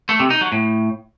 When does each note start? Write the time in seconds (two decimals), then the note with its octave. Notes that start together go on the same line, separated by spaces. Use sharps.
0.09 A3
0.20 C3
0.30 D#4
0.41 F#3
0.52 A2